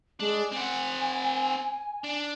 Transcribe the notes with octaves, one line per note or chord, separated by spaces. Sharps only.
G#3 D4
C4 F#5 G#5
D4